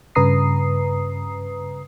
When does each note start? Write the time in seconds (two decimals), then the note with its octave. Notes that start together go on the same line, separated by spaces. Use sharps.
0.15 G2 C#3 B4 A#5 D#6 C7